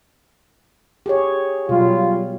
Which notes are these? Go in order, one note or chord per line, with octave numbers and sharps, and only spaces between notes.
G4 G#4 C#5
B2 F#3 G3 F4